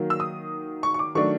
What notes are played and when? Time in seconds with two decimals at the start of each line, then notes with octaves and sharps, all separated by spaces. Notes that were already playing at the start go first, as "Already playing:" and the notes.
Already playing: D#3 F#3 A#3
0.10 E6
0.20 D#6
0.83 C#6
0.94 C#6
0.99 D6
1.15 D#3 F#3 A3 D4 C#6